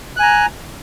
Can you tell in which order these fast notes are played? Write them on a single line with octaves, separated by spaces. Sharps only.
F#6 G#5 A#5